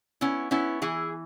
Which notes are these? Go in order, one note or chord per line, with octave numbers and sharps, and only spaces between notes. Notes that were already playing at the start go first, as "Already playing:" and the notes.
B3 C#4 E4
B3 C#4 E4
E3 E4 G#4